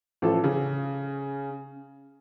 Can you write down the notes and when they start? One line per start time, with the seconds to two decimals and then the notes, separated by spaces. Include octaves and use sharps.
0.22 A1 F3 A4
0.44 C#3 C#4